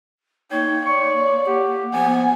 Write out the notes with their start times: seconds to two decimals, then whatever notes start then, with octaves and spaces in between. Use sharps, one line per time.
0.51 A#3 D#4 C#5 G5
0.86 C#5 D5 C#6
1.47 G4 F#5
1.93 F3 B3 G#5